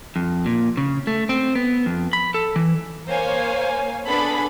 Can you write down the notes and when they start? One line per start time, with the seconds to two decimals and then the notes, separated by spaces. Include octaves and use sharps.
0.16 F2
0.46 A#2
0.77 C#3
1.07 A3
1.29 C4
1.55 B3
1.86 F2
2.13 B5
2.34 A4
2.56 E3
3.08 A#3 C5 C#5 F5 G#5
4.05 B3 D4 G#4 A4 B5